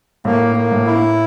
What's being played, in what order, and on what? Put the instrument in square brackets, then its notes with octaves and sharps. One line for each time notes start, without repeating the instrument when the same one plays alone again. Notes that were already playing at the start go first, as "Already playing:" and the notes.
[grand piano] A2 A3 [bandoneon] A#3
[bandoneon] A#3
[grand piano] A2 A3
[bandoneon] E4